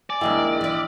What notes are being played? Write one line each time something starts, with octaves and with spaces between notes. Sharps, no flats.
D5 G#5
A#1 D#3 G#3 A#3 E4 D#5 G5
E3 B4